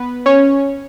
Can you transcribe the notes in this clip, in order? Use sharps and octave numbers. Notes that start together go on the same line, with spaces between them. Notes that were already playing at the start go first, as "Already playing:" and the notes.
Already playing: B3 B4
C#4 C#5